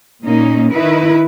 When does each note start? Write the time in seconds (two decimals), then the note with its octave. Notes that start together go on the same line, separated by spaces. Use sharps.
0.24 A#2 A#3 C#4 D#4
0.73 D#3 D#4 E4 B4